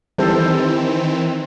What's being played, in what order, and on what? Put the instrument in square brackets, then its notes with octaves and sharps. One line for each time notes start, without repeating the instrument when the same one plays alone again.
[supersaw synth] D#3 E3 C4 [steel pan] G3 A4 C5